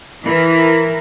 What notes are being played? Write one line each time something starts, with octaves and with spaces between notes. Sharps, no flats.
E3 A#4